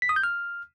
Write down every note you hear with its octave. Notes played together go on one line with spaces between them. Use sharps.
B6
D#6
G6
F6